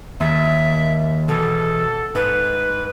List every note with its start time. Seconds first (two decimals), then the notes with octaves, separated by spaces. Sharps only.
0.20 D#2 E5
1.28 B2 E3 A4
2.15 G#2 B4